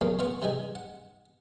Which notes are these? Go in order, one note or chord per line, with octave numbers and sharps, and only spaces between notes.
C#2 F#2 A#2 A#3 B3
E3 B3 F4 F#5 C#6
C3 E3 G3 D#4 G#4
F#5